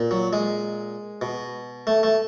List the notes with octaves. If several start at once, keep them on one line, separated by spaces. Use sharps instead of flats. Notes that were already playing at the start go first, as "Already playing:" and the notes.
Already playing: A#2
F#3
G#3
B2
A3
A3